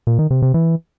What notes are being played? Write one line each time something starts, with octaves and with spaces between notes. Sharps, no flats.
A#2
D#3
C3
C3
E3